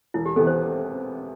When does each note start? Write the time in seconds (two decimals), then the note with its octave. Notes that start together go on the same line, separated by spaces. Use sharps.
0.14 E1 E4
0.26 G4
0.36 E2 C3 E3 B3 A4
0.47 C5